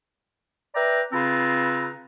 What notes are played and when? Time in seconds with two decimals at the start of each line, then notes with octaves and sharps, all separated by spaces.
0.75 B4 D5 E5 G5 A#5
1.13 C#3 C4 F4 B4 A#5